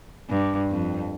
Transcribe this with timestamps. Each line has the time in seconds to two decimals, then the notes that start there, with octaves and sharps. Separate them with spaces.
0.30 G2
0.70 F2